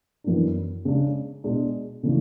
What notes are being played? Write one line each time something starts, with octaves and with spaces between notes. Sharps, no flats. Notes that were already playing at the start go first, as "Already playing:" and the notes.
F#2 E3 B3 D4
C#3 G#3 D4
B2 G#3 D4
C#3 E3 A3 D4